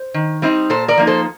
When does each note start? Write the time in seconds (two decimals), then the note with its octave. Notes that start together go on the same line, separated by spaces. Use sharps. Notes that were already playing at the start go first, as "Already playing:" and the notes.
Already playing: C5
0.14 D#3
0.42 G3 C4 D#4
0.70 A#2 A4 C5
0.88 A#4 D5
0.97 F3 A#3 D#4
1.07 A4 C5